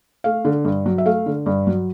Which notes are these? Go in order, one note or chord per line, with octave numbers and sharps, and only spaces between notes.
A3 F5
D3
G2
F#3
E5
A3 F5
D3
G2
F#3